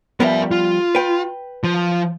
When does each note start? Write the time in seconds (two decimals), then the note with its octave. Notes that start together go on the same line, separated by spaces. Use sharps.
0.20 F3 G3 B3 A#4 E5
0.51 F4
0.95 B4 G5
1.64 F3